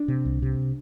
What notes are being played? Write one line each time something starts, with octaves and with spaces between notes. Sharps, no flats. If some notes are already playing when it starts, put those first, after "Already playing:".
Already playing: D4
C3
C2
C3